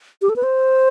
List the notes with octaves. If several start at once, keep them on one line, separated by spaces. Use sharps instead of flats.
G4
A4
B4
C5